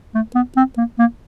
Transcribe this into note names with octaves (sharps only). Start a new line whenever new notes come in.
A3
B3
C4
A#3
A#3